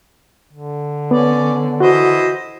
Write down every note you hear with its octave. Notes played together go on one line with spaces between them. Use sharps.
D3
B3 C#4 D5
E3 F#4 C5 D#5